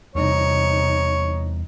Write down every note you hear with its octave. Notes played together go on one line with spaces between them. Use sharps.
E2 C3 G3 D#4 C#5